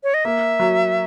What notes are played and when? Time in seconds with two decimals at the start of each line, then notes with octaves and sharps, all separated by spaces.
0.04 C#5
0.14 D#5
0.25 A#3 E5
0.60 F#3